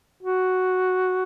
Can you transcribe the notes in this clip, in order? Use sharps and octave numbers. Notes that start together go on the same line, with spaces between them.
F#4